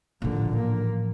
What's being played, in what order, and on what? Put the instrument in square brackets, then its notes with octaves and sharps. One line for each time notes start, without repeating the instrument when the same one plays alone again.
[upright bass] A1 F3 [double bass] A#2 D3
[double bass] A#3